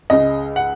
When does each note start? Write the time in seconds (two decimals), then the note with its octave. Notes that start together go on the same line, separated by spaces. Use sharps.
0.10 C#2 C#3 G#3 D#5
0.56 F#5